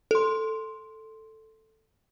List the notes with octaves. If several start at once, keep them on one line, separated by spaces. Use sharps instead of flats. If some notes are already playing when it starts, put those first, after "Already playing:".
A4 C6